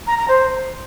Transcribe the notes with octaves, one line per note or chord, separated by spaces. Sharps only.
A#5
A#5
C5